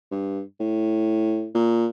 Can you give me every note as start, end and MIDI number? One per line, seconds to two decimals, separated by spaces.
0.11 0.42 43
0.60 1.48 45
1.55 1.87 46